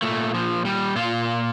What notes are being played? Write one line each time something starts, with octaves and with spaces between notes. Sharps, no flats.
A#2 A3
F3
G3
A#2 F4